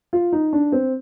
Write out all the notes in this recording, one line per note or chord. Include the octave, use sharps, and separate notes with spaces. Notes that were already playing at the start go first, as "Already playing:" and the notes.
F4
D#4
D4
C4